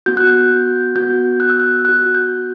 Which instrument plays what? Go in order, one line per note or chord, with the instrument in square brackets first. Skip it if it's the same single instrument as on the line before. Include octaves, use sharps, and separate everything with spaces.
[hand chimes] B3 F#4 G6
F#6
G6
B3 F#4 G6
F#6
E6
F#6
B3 F#4 F#6
G6